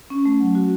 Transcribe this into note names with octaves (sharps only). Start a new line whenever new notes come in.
C#4
A3
F#3
F#4